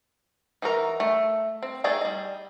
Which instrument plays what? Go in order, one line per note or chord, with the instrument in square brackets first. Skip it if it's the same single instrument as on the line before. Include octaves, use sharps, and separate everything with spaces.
[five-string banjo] E3 D#4 F#4 A#4 A#5
A3
C4
A3 D#4 G#4 D5
G3 D#5